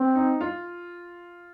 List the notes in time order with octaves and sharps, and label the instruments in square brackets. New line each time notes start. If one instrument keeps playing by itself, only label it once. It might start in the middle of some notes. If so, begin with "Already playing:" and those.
Already playing: [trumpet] C4
[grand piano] D#4
F4